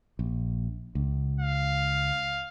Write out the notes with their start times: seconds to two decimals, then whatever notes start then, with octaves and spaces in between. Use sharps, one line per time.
0.19 A#1
0.95 C#2
1.40 F5